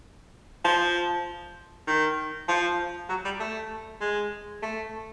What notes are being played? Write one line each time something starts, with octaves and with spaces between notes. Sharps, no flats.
F3
D#3
F3
F#3
G3
A3
G#3
A3